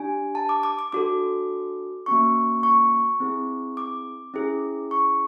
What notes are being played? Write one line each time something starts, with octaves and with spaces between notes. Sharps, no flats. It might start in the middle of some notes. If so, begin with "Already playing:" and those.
Already playing: D4 G4 G#5
A5
D6
D6
D6
D4 F#4 A4 D6
A#3 C#4 F#4 C#6
C#6
C4 E4 G#4
D6
C#4 E4 G#4
C#6